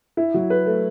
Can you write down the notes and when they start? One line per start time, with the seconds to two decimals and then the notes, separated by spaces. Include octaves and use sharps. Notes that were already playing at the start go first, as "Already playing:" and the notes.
0.17 E4
0.34 F#3
0.50 B4
0.66 A3